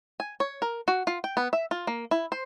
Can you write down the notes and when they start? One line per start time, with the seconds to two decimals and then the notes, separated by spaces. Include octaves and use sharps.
0.20 G#5
0.40 C#5
0.62 A#4
0.88 F#4
1.07 F4
1.24 G5
1.37 B3
1.53 E5
1.71 F4
1.87 A#3
2.11 E4
2.32 C5